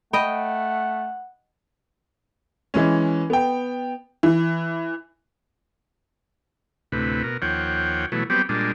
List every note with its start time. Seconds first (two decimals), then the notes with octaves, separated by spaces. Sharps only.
0.13 A3 D#5 F#5 G5 B5
2.74 E3 G#3 C#4
3.30 B3 G5
4.23 E3
6.92 D2 A2 C3 B4
7.23 B2 A#4
7.42 D#2 F3 C#5 F#5 G5
8.12 B2 E3 F#3 A3
8.30 F#3 G3 B3 C4 G4
8.49 A#2 G3 G#3 D4